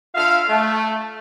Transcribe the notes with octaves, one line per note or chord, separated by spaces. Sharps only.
D3 F4 E5 F5
A3